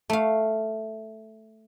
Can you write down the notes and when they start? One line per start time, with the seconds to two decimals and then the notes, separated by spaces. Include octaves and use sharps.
0.10 A3 F5